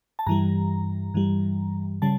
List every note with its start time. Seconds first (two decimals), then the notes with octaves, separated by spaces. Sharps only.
0.19 A5
0.27 G2 E3 G3 A#5
1.14 G2 E3 G3
2.02 C#3 G3 A5